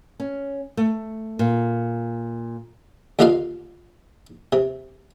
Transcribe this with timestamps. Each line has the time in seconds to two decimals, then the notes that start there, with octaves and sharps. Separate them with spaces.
0.20 C#4
0.77 A3
1.39 A#2
3.19 D#2 D3 A#3 D#4 F4 F5
4.53 C3